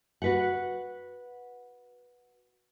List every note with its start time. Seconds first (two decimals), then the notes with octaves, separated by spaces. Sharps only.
0.22 F#4 B4 F#5